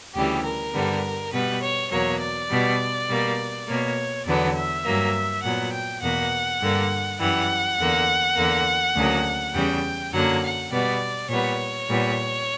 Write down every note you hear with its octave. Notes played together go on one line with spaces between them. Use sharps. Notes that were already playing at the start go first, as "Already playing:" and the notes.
D2 C#3 E3 G3 G4
A#4
G2 D3 G3 B3
B2 G3 B3 B4
C#5
E2 B2 F#3 A#3 C#5
D5
B2 G3 B3
B2 G3 A#3
B2 A#3 C#5
E2 D3 F#3 B3 D5
E5
G2 F#3 A#3
A#2 F#3 B3 F#5
G5
E2 B2 A#3 F#5
G2 D3 A#3
F#2 E3 G3 F#5
E2 D3 A#3
E2 D3 A#3
D2 C#3 F#3 A#3
E2 C#3 G3 G5
F#2 D3 F#3 A#3 F#5
F#5
B2 G3 B3 D5
A#2 G3 B3 C#5
A#2 G3 B3